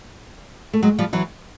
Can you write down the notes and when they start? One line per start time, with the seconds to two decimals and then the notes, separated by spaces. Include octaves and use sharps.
0.73 A3
0.83 F#3 G#3
0.98 F3 G3
1.13 E3 F#3